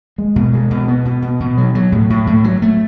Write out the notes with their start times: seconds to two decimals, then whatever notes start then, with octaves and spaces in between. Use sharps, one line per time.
0.18 G#3
0.36 B2
0.53 G#3
0.70 B2
0.88 B3
1.05 B2
1.22 B2
1.40 B2
1.57 F#3
1.75 F#3
1.92 A2
2.10 A2
2.27 A2
2.44 F#3
2.62 A3